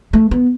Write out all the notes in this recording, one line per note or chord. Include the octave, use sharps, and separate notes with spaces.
A3
B3